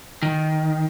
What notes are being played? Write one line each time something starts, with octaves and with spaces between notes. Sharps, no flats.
D#3